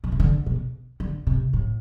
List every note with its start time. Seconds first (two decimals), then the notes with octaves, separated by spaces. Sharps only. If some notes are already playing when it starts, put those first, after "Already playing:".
0.04 B2
0.12 C3
0.20 D3
0.46 B2
1.00 D3
1.27 C3
1.53 A2